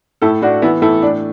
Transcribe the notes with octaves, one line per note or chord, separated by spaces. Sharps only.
A2 E4 A4
A2 D4 F#4
E3 B3 E4
A2 E4 A4
A2 D4